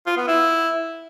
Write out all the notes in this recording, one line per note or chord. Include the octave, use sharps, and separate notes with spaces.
F4
B3
E4